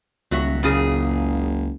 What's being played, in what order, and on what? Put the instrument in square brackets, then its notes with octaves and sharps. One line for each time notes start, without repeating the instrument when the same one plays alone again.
[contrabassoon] D#1 [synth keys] C#2 [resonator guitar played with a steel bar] F#3 F#4 E5
[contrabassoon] F#1 [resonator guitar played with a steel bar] A#2 C#3 G#4